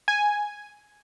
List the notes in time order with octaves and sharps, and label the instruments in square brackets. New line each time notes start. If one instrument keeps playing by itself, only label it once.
[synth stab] G#5